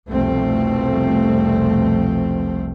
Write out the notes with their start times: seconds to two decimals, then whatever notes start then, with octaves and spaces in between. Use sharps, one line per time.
0.10 F1 C2 B2 F3 A3 C4